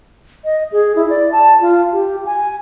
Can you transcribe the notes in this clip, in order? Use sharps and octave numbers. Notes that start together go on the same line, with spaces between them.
D#5
G#4
E4
D5
A5
F4
G4
G#5